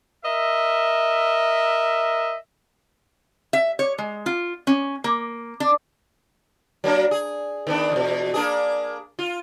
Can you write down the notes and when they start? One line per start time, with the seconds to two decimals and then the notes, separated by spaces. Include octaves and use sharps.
0.25 A#4 D#5 E5
3.53 E5
3.79 C#5
3.98 G#3
4.26 F4
4.67 C#4
5.04 A#3
5.60 D4
6.84 F#3 A#3 D4
7.11 G#4
7.67 D#3 B3 D4
7.92 E2 B2
8.34 A#3 D4 G#4
9.19 F4